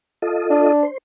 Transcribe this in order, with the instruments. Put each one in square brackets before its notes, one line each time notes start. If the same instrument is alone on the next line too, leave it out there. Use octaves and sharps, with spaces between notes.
[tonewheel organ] F4 A4 D#5
[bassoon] D4
[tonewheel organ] C5